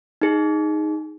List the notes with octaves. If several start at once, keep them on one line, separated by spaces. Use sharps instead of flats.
D#4 G#4